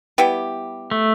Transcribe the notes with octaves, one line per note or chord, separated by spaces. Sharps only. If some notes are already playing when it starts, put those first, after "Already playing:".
G3 B3 E4 G4
A3